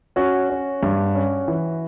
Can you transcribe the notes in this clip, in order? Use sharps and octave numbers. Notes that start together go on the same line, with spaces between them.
C#4 F#4
C#4
G2
C#4
E3